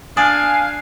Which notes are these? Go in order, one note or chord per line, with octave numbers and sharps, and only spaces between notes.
D4 F5 G#5 D#6